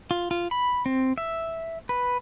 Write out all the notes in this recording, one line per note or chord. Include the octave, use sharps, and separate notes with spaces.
F4
F4
B5
C4
E5
B4